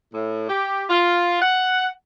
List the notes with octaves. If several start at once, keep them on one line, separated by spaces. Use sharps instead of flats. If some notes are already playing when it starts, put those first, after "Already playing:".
A2
G4
F4
F#5